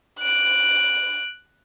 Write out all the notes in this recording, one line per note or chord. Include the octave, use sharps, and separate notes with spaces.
F#6 D7